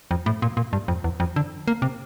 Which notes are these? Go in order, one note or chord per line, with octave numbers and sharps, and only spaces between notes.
F2
A2
A#2
A#2
G2
F2
E2
F2
D3
A#3
C3